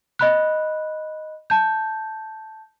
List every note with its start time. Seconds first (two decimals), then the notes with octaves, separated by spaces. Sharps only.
0.19 D#5 B5 F#6
1.50 A5 G6